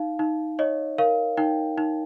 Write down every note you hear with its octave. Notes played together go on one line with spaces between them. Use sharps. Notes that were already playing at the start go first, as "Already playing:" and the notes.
Already playing: D#4 F5
D#4
C#5 D#5
A#4 F5
D#4 G5
D#4